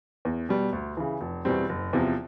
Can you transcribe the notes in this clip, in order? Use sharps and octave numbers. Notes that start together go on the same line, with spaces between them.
E2
B2 G3
D2
C#3 E3
F1
E2 B2 G3 C4
F#1
E2 C3 F3